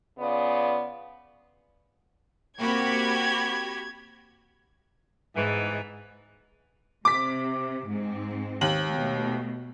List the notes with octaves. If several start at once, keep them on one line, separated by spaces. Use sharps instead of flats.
C#3 B3 F4 D5
A#3 C4 F#4 G4 B5 G#6
G#2 B2 E3
C3 D6 B6
G#2 C4
D#2 F#7
B2 A3